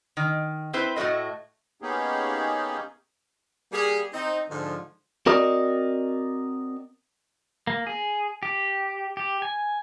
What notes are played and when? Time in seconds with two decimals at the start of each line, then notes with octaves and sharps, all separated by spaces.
0.17 D#3
0.73 C4 E4 B4 C5
0.96 A2 A3 F#4 B4 D#5
1.82 A#3 B3 C#4 D#4 G4 G#4
3.72 G3 A#3 G4 G#4
4.14 C4 D#4
4.50 G#2 D3 F3
5.26 C4 F#4 A#4 D5 D#5
7.67 A#3
7.87 G#4
8.43 G4
9.17 G4
9.42 G#5